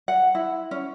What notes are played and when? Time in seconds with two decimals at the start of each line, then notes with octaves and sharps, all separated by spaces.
0.08 F#5
0.35 E4
0.71 C#4